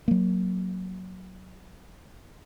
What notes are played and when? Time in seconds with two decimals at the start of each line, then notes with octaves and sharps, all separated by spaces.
0.08 F#3 A#3